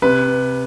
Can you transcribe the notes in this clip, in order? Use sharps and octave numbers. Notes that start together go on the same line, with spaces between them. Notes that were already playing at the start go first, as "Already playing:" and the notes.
C3 B4